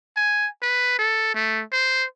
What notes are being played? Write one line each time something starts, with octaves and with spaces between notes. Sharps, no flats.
G#5
B4
A4
A3
C5